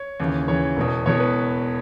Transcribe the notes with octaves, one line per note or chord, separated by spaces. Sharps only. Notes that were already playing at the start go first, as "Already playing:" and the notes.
Already playing: C#5
D#2 C#3 E3
D#2 C#3 E3 C#5
E1 E2 B2
E1 E2 B2 C#5
B4